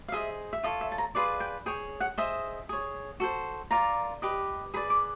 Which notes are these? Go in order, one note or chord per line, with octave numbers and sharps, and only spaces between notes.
F5
G#4 C5 D#5 E5
E5
F4 A4 C#5 D#5
E5
A5
A#5
F4 G#4 B4 D5 C6
G5
G#4 C#5 G5
F#5
G#4 C5 D#5 E5
G#4 C#5
F#4 A4 C5
F4 A#4 D5 A#5
G4 B4 D#5
G#4 B4 D5 B5
D6